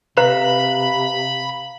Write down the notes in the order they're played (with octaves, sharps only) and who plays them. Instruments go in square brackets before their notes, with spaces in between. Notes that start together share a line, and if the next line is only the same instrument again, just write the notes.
[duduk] C3 [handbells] B4 [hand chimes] F5 A#5 [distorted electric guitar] B5